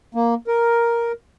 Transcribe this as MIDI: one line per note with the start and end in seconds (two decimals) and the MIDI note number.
0.15 0.34 58
0.47 1.12 70